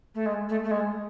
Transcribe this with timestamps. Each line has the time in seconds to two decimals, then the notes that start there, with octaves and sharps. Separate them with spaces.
0.14 A3
0.25 G#3
0.49 A3
0.64 A3
0.71 G#3